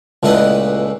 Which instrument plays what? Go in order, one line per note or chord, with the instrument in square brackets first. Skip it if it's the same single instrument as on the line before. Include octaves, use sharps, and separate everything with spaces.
[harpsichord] C#2 A#2 A3 E4 B4 D#5